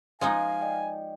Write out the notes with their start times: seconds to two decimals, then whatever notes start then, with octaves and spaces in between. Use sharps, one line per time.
0.21 F3 G#3 D#4 F5 G#5
0.61 D5 D#5 G5